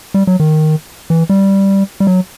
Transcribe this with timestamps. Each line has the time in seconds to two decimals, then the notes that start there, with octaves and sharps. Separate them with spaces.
0.14 G3
0.27 F#3
0.40 D#3
1.10 E3
1.30 G3
2.00 G3
2.07 F#3